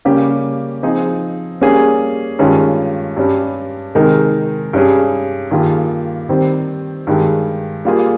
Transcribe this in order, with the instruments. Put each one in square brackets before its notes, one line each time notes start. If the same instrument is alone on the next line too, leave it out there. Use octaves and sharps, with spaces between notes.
[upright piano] C#3 G3 A#3 C#4 G4
F3 C4 D#4 G#4
G3 A#3 C#4 G#4
G2 D#3 G#3 C#4 F4
G2 G3 C#4
C3 D#3 G#3 D#4 A#4
G2 G3 C#4 G#4
G2 D#3 A#3 F4 G#4
D#3 G3 C4
G2 D#3 G#3
G3 A#3 F4 G#4